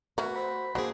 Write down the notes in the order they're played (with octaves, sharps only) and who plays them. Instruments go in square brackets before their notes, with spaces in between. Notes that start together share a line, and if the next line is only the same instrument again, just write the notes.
[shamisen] A3 A#4 C#5 [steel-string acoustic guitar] F#4 [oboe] B4
[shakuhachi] C5 [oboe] B5
[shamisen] F#3 [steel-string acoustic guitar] A#3 D4 G#4 [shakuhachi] C5